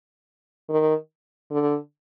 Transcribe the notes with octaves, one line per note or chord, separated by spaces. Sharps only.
D#3
D3